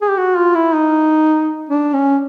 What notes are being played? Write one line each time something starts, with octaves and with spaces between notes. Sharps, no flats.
G#4
G4
F#4
F4
E4
D#4
D4
C#4